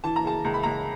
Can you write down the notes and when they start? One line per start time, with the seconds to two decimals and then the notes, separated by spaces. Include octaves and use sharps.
0.04 E3 A5
0.16 A#5
0.25 C#3 A5
0.44 C#2 A#5
0.54 B5
0.63 C#2 A#5